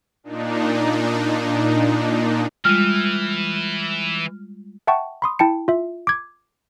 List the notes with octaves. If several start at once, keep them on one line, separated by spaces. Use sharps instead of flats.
A#2 D4 D#4
E3 G3 G#3 F4 F6
E5 F#5 G5 A5 C#6
B5 C6 D#6
E4 G5 A5 C#7
F4 E5
D6 G#6